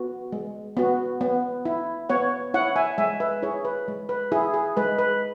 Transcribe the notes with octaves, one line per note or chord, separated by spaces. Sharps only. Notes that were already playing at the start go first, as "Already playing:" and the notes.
Already playing: B3 F#4
G#3
B3 F#4
B3
E4
B3 C#5 F#5
E4 C#5 F#5
E5 G#5
G#3 E5 G#5
B4 E5
E4 G#4 C#5
B4
G#3
B4
E4 G#4
G#4
G#3 B4
B4